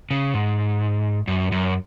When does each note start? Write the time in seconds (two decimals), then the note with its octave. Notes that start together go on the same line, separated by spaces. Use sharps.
0.11 C#3
0.34 G#2
1.27 F#2
1.52 F#2